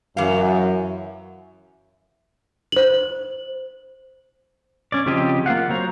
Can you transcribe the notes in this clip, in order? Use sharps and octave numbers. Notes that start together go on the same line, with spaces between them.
F#2 E3 F5
C5 F#7
C#4 D5
C#3 F3 C4 G4 D#5
A#3 F4 F5 F#5
F#3 C5 A#5